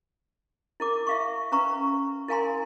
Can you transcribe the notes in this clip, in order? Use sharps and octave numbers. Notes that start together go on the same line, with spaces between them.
E4 A#4 D6
E5 F5 C#6
C#4 B4 A#5 C#6 E6
E4 A#4 F5 G#5 A#5 C6